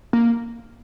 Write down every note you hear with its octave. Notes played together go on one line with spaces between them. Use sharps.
A#3